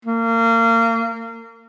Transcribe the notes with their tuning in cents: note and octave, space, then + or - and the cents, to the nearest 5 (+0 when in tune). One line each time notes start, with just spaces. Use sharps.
A#3 -30